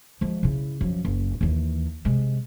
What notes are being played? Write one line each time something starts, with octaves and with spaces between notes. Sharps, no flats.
F3 G#3
C#3 E4
F#2 F3
F#1
D#2 E3
C3 G#3